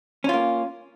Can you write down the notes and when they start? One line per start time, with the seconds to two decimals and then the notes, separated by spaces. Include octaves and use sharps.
0.24 C#4
0.29 F4
0.34 A#3